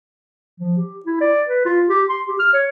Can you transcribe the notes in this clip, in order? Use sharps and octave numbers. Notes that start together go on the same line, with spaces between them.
F3
G4
E4
D5
B4
F4
G4
C6
G4
F6
C#5